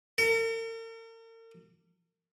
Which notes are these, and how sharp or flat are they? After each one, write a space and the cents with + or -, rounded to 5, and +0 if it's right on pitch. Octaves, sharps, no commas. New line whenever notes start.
A#4 -45